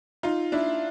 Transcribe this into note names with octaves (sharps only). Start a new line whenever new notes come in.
D#4 F4
D4 E4